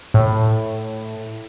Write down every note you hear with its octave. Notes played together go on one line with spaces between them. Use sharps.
A2